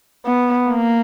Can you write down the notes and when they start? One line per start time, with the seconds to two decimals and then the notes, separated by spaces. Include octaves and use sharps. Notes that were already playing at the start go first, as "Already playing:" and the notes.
0.26 B3
0.68 A#3